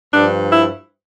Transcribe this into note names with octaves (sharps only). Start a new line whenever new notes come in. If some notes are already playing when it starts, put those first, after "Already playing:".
G2 F3 D4
E4